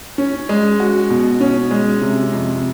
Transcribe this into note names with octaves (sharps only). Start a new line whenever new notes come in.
C#4
G#3
F#4
B2
C#4
G#3
C3
F2